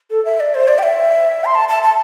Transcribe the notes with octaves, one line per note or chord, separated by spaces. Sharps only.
A4
E5
D5
C5
D5
G5
E5
C6
A5
A5
A5